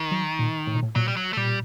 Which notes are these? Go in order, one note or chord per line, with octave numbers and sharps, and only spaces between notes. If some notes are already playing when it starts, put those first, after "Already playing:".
Already playing: D#3
F#3
A#2
A2
A#2
A2
A#2 F#3
G3
F#3
A3
A#2 G3